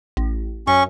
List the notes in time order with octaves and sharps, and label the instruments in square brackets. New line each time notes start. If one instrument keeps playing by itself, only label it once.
[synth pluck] A1
[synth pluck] F#2 [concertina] C#4 C#6